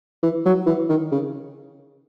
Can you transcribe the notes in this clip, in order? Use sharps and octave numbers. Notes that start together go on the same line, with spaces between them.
E3
F#3
E3
D#3
C#3